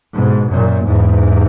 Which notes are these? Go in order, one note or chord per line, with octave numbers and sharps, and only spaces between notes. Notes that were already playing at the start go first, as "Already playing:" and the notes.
G#2 B2
F#2 A#2
E2 G#2